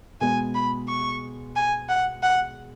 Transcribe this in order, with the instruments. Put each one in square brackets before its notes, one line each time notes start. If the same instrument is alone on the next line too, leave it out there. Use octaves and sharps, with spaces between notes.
[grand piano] B2 G#3 B3 [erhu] G#5
[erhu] B5
C#6
G#5
F#5
F#5